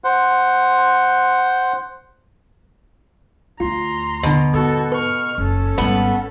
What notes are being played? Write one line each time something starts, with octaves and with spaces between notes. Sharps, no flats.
C5 F#5
D2 F4 A#5 C6
D#2 B2 D3
G#2 B3 F#4 A4
B4 C#6 F6
F#1 C#4 A4
G#1 G3 B3